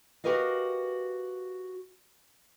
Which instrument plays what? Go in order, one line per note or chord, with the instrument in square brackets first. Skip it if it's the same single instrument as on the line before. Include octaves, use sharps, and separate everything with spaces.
[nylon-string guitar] F#4 G4 A#4 B4 D#5 F5